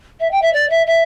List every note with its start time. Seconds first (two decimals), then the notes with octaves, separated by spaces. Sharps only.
0.20 E5
0.31 G5
0.42 E5
0.53 D5
0.70 E5
0.86 E5